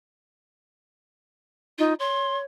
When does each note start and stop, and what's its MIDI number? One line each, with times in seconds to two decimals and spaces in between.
1.79 1.93 63
1.79 1.95 65
1.99 2.45 73
1.99 2.37 84